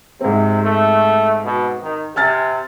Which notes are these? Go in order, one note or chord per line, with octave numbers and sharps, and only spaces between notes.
G#2 C3 C4
A3
B2
D#3
C3 G#5 F6 A6